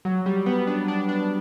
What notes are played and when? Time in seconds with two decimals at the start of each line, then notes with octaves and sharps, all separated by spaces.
0.05 F#3
0.26 G3
0.46 B3
0.67 D4
0.88 D4
1.09 D4